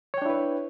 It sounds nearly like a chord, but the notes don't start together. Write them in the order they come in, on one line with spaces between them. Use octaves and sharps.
C#5 G5 D4 E4 B4